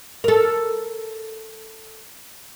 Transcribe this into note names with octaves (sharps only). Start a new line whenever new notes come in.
A4 A#4